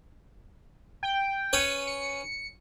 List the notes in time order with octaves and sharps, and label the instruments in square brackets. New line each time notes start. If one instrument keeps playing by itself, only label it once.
[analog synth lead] G5
[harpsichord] C#4 B4 C#5
[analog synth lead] C#7